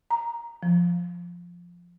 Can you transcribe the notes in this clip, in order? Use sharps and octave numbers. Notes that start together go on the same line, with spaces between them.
A#5
F3